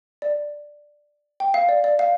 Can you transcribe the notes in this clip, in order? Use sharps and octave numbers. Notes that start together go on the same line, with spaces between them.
D5
G5
F5
D5
D5
F5